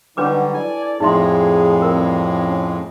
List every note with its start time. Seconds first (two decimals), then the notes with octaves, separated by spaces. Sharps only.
0.17 D3 F#3 G3 D4 D#4 B4 D6
0.54 E4 A4 D5 G#5
1.00 F2 A2 G#3 D#4 G#4 E5 C6
1.82 A1 G3 C4 A#4
2.42 C#4